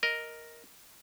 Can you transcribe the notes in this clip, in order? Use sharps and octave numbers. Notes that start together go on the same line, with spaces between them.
A#4 D#5